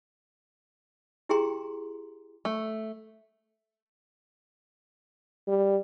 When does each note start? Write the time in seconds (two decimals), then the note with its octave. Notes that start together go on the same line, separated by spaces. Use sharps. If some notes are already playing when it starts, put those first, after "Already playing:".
1.29 E4 G4 G#4 G5 A#5 C6
2.45 A3
5.48 G3